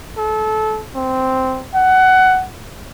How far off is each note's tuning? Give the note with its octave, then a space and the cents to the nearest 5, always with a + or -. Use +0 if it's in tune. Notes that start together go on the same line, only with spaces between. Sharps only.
A4 -25
C4 -5
F#5 +15